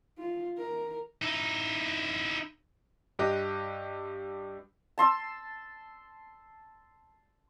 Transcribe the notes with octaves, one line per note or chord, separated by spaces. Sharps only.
F4
A#4
D#4 E4
G2 G4 D#5 F#6 A#6
A5 C6 E6